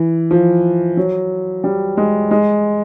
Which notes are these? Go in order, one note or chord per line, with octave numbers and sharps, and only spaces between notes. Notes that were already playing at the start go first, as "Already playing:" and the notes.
Already playing: E3
F3
F#3
G3
G#3
G#3